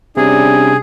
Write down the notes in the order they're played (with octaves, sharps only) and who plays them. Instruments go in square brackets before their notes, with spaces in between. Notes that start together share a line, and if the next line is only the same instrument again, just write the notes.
[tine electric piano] C3 [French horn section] G3 C#4 D4 [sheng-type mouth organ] G#4